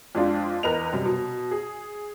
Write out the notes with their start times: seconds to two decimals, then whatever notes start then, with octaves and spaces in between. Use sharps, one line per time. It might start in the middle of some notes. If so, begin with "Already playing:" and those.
0.15 F2 G#3 D4 F4
0.63 E2 A#4 B4 D#5 F7
0.93 F#2 C3 G3
1.05 B2
1.51 G#4